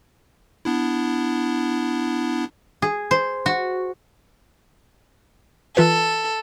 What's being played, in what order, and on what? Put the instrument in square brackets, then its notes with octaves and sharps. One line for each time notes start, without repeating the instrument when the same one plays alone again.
[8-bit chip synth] B3 D4 E4
[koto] G#4
C5
F#4
[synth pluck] E3 F4 B4 [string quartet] A4